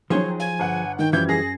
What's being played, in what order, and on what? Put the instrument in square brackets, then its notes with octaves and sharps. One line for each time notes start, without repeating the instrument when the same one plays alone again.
[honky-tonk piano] D#3 F#3 [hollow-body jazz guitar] F3 G#4 C5 [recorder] C#5
[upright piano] F5 [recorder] G#5
[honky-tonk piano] G1 F#5
[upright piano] D#3 [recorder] G5
[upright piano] F#2 [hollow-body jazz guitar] E3 F3 G3 [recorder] G6 [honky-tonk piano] G#6
[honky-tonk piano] G#4 [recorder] A#6